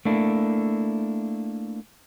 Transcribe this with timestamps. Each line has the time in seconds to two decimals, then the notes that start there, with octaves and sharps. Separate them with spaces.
0.05 A3 A#3 D4 E4